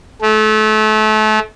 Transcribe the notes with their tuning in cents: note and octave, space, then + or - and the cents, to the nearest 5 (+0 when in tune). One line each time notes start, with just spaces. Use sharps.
A3 -30